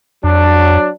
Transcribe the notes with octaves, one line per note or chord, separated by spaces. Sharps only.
F2 F#3 D4